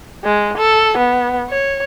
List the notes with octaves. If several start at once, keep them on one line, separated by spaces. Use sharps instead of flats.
G#3
A4
B3
C#5